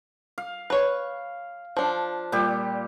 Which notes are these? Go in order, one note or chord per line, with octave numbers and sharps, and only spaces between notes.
F5
B4 C#5
F3 D4
A#2 G3 G4